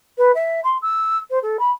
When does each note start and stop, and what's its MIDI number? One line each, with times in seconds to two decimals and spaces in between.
0.18 0.32 71
0.35 0.60 76
0.64 0.77 84
0.82 1.18 88
1.30 1.39 72
1.42 1.57 69
1.59 1.71 83